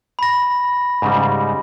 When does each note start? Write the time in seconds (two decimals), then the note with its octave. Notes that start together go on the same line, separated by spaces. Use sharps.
0.19 B5 A#6
1.02 G#2 C#3 G3